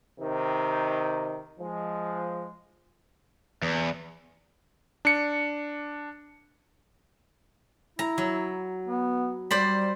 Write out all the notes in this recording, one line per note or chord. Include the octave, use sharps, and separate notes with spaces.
C3 D#3 D#4
F3 G#3
E2
D4 C#7
E4 A#5
F#3
B3
G3 C5 D5 B5